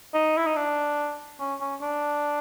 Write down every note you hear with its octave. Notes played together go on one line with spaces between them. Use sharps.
D#4
E4
D#4
D4
C#4
C#4
D4